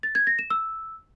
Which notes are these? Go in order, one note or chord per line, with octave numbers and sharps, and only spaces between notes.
A6
G#6
A#6
E7
E6